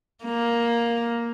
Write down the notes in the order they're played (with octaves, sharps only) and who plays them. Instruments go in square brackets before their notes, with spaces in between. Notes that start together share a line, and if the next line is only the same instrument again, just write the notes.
[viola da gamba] A#3